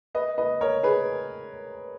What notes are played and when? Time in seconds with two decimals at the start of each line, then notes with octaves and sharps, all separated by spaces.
0.15 B4 D#5
0.38 B4 D#5
0.61 A#4 C#5
0.83 G#4 B4